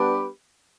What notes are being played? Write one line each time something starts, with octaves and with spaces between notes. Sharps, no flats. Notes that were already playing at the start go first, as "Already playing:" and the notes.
Already playing: G3 B3 D4 G4 B4